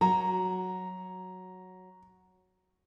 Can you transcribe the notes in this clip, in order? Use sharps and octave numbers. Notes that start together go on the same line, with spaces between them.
F#3 F#4 A#5